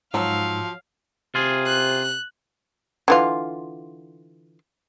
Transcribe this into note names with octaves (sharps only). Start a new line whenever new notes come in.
G#2 F3 F#3 F5 E6
C3 F4 G#4
F#6
D3 E3 F4